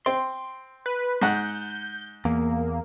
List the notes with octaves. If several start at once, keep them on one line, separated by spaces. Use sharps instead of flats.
C4 C6
B4
G#2 F#5 G6
E2 A#3